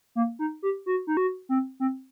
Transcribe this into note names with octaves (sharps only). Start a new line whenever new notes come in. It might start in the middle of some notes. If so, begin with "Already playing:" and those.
A#3
D#4
G4
F#4
D#4
F#4
C4
C4